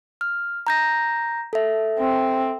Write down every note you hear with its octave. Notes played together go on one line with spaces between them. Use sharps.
F6
A#5 G6 A#6
A4 E5
C4